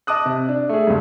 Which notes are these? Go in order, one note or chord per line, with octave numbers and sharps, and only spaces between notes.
D#5 A5 D6 D#6 F#6
C3
D4
A3 G#4
C#2 G2